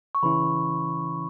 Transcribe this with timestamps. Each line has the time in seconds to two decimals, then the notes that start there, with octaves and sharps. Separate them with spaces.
0.15 C#6
0.23 C#3 E3 C#4 E4 B5